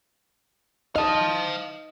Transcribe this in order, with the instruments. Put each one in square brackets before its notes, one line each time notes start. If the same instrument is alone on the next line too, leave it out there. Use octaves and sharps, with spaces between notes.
[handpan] D#5 [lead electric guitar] F5 A5